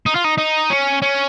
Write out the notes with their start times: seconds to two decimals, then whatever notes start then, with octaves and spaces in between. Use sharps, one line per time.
0.06 D#4
0.15 F4
0.24 D#4
0.38 D#4
0.70 C#4
1.02 C#4